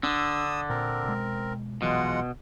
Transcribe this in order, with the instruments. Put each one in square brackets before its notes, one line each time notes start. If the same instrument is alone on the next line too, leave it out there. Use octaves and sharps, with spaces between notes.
[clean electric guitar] D3 [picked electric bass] C#4 D4 [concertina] D#6 E6
[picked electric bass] A#2 [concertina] C4 A#4
[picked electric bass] B2 G#3
[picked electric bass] A#1 E3 F#3 [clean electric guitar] B2 [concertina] G#3 F4 F#5